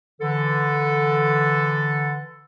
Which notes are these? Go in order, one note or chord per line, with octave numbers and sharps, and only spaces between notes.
D3 E3 A4